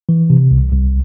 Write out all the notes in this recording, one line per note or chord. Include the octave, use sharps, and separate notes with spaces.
E3
C3
C2
C2